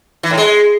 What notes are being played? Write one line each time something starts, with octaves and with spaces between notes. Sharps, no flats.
E3
A2
G#3